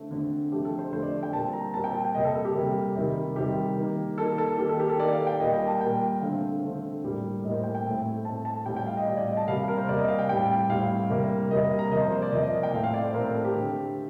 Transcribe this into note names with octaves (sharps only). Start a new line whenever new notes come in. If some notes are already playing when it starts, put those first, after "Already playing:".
Already playing: D3 A3 C4
D3 A3 C4
D3 F3 A3 C4 G4
A4
C5
D3 F3 A3 C4 C5
D5
G5
A#2 G3 C4 A5
A#5
A#2 G3 C4 A5
G5
A5
G5
C3 G3 A#3 D#5
A4
A4
G4
C3 G3 A#3
C3 D#3 G3
C3 D#3 G3 G4
D#3 A#3
D#3 A#3 A4
A4
D#3 A#3 G4
A4
G4
A4
D#3 A#3 D5
F5
G5
A#2 G3 A#3 D#5
G5
A5
A#2 G3 A#3 G5
D3 A3 C4 F5
D3 A3 C4
A2 G3 A#3
A2 G3 A#3 D#5
C5
G5
G5
A2 A3 C4
A2 A3 C4 A5
A5
A2 G3 C4 G5
G5
F5
D#5
A2 G3 C4 D5
D5
D#5
A5
C3 G3 A#3 F5
A#4
C5
C3 G3 A#3 D5
D#5
F5
G5
A2 G3 C4 G5
A2 G3 C4 F5
C3 G3 A#3
C3 G3 A#3 D#5
A#5
C3 F3 A#3 D#5
C5
C5
D5
C3 F3 A#3 D#5
D#5
G5
A2 A3 C4 F5
F5
D5
C5
A2 A3 C4 A#4
A#4
A4
G4
D3 A3 C4